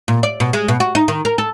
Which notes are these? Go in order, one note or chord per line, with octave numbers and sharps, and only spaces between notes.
A#2
D5
B2
G#3
B2
F#4
D#4
D#3
A#4
A4